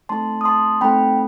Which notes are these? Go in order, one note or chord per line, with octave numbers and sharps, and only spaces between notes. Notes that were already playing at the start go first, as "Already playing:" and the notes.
A3 C4 D#4 A4 A5 C6
D#6
A5 C6
A3 C4 D#4 A4 G5 B5